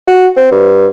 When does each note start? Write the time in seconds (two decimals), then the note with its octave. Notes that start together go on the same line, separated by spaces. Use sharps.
0.07 F#4
0.37 C4
0.52 G2